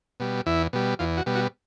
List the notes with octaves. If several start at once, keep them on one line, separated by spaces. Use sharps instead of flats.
B2 G3
E2 E4
B2 G3
E2 F4
F#4
B2 G3
F#4